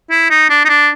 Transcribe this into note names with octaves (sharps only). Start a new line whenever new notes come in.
E4
D#4
D4
D#4
D4